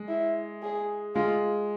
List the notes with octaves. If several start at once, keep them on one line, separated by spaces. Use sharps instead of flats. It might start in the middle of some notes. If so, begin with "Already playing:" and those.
Already playing: G#3
E4
G#4
G#3 F4